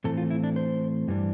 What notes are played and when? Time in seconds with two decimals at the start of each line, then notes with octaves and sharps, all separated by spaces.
0.04 A2 E3 A3 C4 A4
0.17 F4
0.30 E4
0.44 D4
0.56 C5
1.08 G2 E3 G3 D4